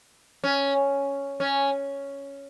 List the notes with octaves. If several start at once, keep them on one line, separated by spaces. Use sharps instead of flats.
C#4
C#4